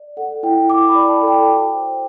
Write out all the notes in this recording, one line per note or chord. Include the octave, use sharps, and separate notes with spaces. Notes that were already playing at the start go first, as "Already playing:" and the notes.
Already playing: D5
A4 F#5
E4 G5
E4 D6
B5
D5
A5
A4
G5
F#4
C5